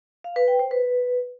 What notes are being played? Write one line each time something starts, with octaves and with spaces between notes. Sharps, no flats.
F5
B4
G5
C5
B4